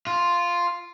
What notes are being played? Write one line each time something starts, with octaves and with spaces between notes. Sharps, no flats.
F4